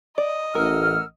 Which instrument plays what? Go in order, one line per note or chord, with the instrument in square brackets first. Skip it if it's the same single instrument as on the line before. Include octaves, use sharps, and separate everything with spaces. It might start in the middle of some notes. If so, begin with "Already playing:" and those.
[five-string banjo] D5 [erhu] D#5
[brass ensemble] A1 [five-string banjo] A#4 [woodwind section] F#5 E6 F6